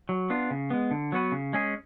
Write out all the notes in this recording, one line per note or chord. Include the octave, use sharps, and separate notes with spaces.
F#3
B3 D4 F4
C#3
G#3 B3
D3
F#3 B3 F#4 B4
C#3
G#3 C#4 G#4